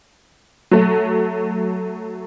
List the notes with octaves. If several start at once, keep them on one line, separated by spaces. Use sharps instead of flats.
F#3 A3